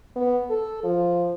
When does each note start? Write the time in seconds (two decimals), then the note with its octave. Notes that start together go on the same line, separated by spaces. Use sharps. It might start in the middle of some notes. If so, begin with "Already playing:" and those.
0.16 B3
0.50 A4
0.84 F3